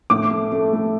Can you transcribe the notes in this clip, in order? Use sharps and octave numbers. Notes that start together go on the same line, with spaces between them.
A2 D6
A3
A3
A3